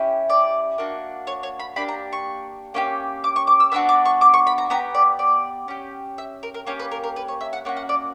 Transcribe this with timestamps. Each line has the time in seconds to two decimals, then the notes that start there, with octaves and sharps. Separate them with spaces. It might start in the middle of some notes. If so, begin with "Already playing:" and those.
Already playing: C#4 E4 G4
0.30 D5
0.78 A#3 D4 F#4
1.27 C#5
1.43 C#5
1.59 B5
1.76 A#3 D4 G4 B5
1.88 A#5
2.12 C#6
2.74 A#3 C#4 E4 G4
3.24 D6
3.36 C#6
3.47 D6
3.60 E6
3.72 B3 D4 F#4 E6
3.89 D6
4.05 C#6
4.21 D6
4.34 C#6
4.47 B5
4.58 A#5
4.70 B3 E4 G4 A#5
4.94 D5
5.19 D5
5.68 C#4 G4
6.18 E5
6.43 A#4
6.54 A#4
6.67 A#3 C#4 G4 C#5
6.79 B4
6.91 A#4
7.04 A#4
7.16 B4
7.28 C#5
7.41 E5
7.53 F#5
7.65 A#3 C#4 F#4 F#5
7.77 F#5
7.89 D5